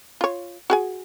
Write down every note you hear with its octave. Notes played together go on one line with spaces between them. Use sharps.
F4 C#5
F#4 G#4 G#5